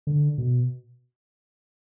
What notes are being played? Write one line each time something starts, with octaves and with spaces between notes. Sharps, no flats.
D3
B2